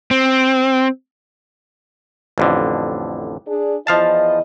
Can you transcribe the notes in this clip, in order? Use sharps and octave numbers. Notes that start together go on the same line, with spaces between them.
C4
A1 F2 D3
D4 G#4
E2 F3 E4 D#5 F5 A5